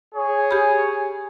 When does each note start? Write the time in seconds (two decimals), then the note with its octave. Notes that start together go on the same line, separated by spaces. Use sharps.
0.15 G#4 C#5
0.51 G4 B5